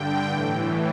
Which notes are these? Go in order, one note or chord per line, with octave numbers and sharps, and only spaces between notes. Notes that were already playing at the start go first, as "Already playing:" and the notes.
Already playing: G2 D3 G5
A2 E3